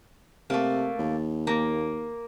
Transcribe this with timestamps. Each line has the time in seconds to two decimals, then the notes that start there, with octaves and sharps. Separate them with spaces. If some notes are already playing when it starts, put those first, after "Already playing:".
0.50 C3 A3 A#3
0.99 D#2
1.47 A#3